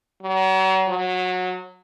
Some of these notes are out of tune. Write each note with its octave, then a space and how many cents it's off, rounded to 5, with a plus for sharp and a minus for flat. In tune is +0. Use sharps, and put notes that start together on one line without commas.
F#3 +40
F#3 -20